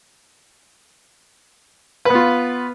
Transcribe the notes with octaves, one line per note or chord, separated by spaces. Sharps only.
B3 F4 B4